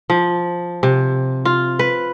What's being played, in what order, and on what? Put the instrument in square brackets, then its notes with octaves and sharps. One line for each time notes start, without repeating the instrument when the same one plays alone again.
[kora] F3
C3
F4
B4